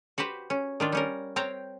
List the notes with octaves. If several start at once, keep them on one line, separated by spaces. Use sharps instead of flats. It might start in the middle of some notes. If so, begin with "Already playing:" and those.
F#4 G4 B4 C5
C#4
D#3 D4 F4
G3 C#4 A#4
C4 C#5 F5 G5 A#5